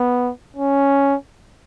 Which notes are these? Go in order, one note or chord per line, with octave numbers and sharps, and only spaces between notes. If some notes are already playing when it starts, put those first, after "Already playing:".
Already playing: B3
C#4